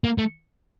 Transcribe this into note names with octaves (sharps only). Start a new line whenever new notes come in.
A#3
A3